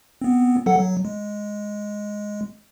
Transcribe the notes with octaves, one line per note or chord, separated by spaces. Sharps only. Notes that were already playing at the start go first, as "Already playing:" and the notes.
B3 C4
F#3 A4 F#5
F#3
G#3